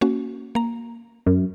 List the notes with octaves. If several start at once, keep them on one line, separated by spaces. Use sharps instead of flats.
A#3 C#4 F#4
A#3 A#5
F#2